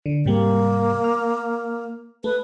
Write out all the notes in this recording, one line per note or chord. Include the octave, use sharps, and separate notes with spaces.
D3
G#2 C3 G3 A#3
F6
A3 B4